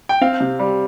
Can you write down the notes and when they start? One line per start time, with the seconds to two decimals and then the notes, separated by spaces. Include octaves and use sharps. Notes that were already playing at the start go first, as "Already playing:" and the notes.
0.09 G5
0.21 C4 F5
0.40 C3
0.59 G3